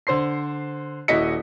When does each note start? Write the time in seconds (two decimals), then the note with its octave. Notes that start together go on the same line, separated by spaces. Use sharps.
0.07 D3 C5 C6 C7
1.08 D#1 E4 F#4 D#5 B6 C#7